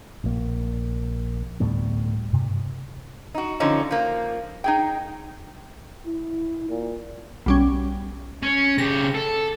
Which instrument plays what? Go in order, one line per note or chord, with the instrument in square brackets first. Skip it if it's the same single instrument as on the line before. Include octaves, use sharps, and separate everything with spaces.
[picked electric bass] A#1 A#3
D2 A2 G3 B3
G2 C3
[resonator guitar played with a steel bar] D#4 F#4
D3 F3 C#4 D#4
F3 A#3
D#4 G#4 G5
[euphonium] E4
A#2
[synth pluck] B1 G3 C#4
[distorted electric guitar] C#4
[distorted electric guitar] C#3 G4 [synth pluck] A#6
[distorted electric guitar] A4